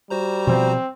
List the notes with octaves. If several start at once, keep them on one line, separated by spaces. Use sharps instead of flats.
G3 F#4 C5 A#5
B2 F3 C4